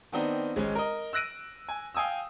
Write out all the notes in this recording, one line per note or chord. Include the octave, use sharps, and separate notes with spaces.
D#3 B3 C4 D4 D#4
G#1 G#3 C#4
A#4 D#5
E6 F#6 A#6 D7 D#7
G#5
F5 G5 G#5 D#6 E6